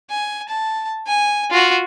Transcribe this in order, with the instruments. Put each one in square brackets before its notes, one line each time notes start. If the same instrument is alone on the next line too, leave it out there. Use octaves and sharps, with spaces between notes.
[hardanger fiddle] G#5
A5
G#5
F4 F#4